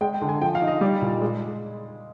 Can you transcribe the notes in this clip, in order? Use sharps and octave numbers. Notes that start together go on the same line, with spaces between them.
G#3 G5
G5
D3
G#5
F3 G5
F5
D#4
D#5
G3 D5
A#2
G#3